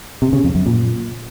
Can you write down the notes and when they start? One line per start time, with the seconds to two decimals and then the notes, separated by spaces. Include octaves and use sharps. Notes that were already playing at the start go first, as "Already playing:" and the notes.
0.22 C3
0.33 C#3
0.44 F2
0.55 F#2
0.66 A#2